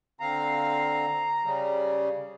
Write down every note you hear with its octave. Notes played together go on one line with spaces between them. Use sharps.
D3 C4 F5 A#5
C#3 G3